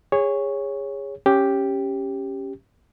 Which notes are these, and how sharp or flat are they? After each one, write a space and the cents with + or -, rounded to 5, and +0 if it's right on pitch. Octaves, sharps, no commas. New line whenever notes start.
G#4 -25 C#5 +0
C#4 -10 G4 +0